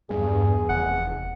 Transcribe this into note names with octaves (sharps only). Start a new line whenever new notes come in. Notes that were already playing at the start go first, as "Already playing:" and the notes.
E2 G2 G#4
F1 F#5